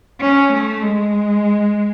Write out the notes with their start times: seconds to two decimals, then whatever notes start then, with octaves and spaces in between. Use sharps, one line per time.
0.21 C#4
0.52 A3
0.82 G#3